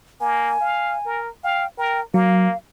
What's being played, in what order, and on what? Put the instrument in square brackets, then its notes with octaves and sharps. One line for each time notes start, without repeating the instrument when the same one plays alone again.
[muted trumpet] A#3 [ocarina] G#5
[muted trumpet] F5
A#4
[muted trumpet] F5 [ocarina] G5
[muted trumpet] A#4 [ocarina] G5
[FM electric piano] F#3 [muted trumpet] A#3 [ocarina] F5